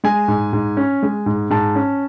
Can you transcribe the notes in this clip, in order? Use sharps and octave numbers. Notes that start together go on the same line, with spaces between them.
G#3 G#5
G#2
G#2
C#4
G#3
G#2
G#2 A5
C#4